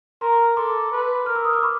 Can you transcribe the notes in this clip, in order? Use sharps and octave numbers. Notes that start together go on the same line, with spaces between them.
A#4 A#5 C6
A4 C6 D6
B4
A#4 F6
E6
D#6
D6
B5 C#6